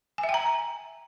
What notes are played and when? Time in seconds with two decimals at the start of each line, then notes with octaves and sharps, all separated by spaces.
0.18 G#5
0.23 E5
0.29 G5
0.34 A#5